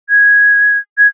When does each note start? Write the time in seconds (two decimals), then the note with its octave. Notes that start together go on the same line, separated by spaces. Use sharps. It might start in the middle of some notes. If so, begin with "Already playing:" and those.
0.10 G#6
0.98 G#6